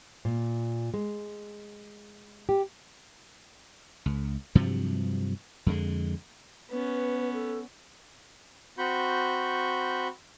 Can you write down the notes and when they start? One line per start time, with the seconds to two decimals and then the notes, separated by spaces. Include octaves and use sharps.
0.25 A#2
0.94 G#3
2.49 G4
4.06 C#2
4.55 G2 C3 F3 F#3
5.66 F2 D3 G#3
6.71 B3 C#4 B4
7.33 A4
8.78 C4 F#4 B5 C#6 G6